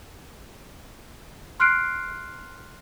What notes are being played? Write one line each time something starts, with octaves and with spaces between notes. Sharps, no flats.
C6 F6 F#6 C7 D7